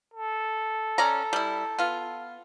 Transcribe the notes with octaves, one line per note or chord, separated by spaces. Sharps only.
A4
C#4 D5 A#5
G3 E4
B3 F4